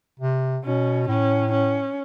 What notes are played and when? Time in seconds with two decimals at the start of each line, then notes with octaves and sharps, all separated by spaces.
0.20 C3
0.64 B2 C#4
1.08 A2 C#4
1.52 C#4